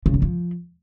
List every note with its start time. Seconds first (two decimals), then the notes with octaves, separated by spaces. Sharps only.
0.06 C#3
0.14 E2
0.22 F3